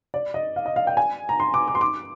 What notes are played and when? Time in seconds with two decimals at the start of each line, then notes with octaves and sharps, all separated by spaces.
0.14 D5
0.34 D#5
0.56 F5
0.66 D#5
0.76 F5
0.87 G5
0.97 G#5
1.29 A#5
1.40 C6
1.54 D6
1.68 D6
1.75 C6
1.81 D6